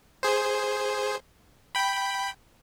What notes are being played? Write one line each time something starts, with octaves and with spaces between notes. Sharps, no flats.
G#4 C5
G5 B5